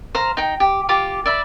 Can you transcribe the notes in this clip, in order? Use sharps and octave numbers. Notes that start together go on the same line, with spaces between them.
C5 F5 A#5
D#4 G5
G4
F4 G4 D6
D5 E5 B5